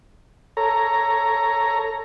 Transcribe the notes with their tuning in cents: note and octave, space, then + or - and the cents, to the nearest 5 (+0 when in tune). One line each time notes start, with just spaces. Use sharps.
A4 +15 C#5 +0 A#5 +0